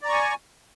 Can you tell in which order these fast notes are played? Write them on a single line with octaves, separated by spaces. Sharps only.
D5 A#5 C#6 G#5